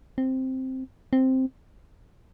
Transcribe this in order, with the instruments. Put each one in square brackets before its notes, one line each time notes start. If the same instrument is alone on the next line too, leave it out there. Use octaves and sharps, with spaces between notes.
[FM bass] C4
C4